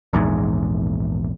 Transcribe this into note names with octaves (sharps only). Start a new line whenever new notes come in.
A#1 E2 G#2